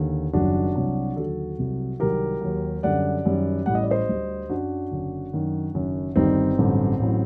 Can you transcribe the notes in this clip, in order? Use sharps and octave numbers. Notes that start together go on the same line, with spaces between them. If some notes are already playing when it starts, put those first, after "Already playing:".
Already playing: D#2 D3
F#1 F#2 D#3 G3 D4 F#4
C2 C3 F#3
D#2 D3 F#3 F#4 A4
C2 C3 F#3
C2 C3 D#3 F#3 G4 A#4
D#2 D#3 F#3
F#2 D3 G3 D5 F#5
F#2 D#3 G3
A1 A2 G3 F#5
D#5
D5
C5 D#5
D2 D3 G3
F#2 F#3 D4 F#4
F#1 F#2 D3
F#2 D#3 F#3
F#1 F#2 D#3
G1 G2 D#3 G3 C4 D#4
A1 G2 D3 F#3
A1 A2 F#3